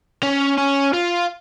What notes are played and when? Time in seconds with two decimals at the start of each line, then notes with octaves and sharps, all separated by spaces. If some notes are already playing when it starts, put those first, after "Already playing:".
0.23 C#4
0.58 C#4
0.93 F4